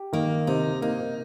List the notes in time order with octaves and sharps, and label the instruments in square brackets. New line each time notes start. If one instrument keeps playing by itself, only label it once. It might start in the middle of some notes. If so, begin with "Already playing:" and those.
Already playing: [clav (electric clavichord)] G4
[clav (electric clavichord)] D#3 [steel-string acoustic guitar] A#3
[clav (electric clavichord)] C3 [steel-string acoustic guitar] D#4
[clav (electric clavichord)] A#3 [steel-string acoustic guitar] D#4